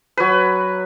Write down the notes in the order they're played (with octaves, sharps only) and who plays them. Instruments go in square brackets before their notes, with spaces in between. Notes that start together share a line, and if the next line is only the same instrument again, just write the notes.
[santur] F#3 B4